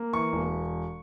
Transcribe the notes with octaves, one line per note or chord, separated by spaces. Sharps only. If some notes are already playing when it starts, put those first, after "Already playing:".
Already playing: A#3
E3 C#6
E1